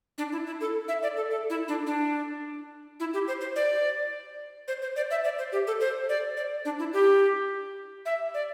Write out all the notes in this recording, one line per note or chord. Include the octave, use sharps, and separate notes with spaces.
D4
E4
E4
A4
E5
D5
A4
A4
E4
D4
D4
E4
G4
C5
C5
D5
C5
C5
D5
E5
D5
C5
G4
A4
C5
D5
D5
D4
E4
G4
E5
D5